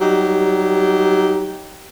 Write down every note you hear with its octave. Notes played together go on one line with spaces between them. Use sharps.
F#3 G3 D#4 G4